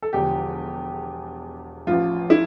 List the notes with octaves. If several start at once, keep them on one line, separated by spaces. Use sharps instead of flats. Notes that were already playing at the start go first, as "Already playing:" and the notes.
A4
E1 E2 D3 F3 G4
A1 A2 F3 F4
E4